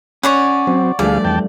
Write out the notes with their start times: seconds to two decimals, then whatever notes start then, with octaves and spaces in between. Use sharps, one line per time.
0.23 C#4 C#5 D5 F#5
0.67 F#3 C4
0.99 D2 G2 F3 A3 G#4 D5 F5
1.24 E2 G5 A5